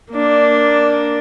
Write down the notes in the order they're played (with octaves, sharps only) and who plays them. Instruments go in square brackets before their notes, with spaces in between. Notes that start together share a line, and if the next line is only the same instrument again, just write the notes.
[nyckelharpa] A#3 D4